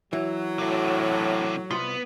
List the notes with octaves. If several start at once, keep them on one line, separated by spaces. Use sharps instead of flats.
E3 F#3
A2 C3 D4
C2 B3 F4 C6